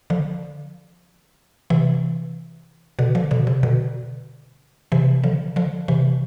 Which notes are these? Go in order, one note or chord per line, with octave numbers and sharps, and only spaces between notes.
D3 F3
C3 E3
B2 D3
D3 F3
B2 D3
C3
B2 D3
C3 E3
D3 F3
D3 F3
C3 E3